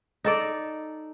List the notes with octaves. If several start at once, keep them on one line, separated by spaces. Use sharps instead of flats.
D#4 A4 D5